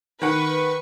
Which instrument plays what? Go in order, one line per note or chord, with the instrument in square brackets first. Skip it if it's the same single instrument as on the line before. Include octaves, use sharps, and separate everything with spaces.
[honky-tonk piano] D#3 F#5 [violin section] B4 C#6